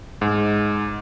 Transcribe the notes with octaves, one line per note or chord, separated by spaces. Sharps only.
G#2